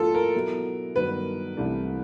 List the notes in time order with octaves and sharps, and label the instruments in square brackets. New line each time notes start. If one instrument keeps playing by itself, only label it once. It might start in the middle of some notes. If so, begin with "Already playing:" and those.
Already playing: [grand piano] G#2 F3 A#3 D4 F#4 [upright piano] F4 A4
[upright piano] A#4
[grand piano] B2 F#3 B3 E4 A4
[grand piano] G2 D#3 F#3 B3 [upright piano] B4
[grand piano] C2 C3 E3 A3 D4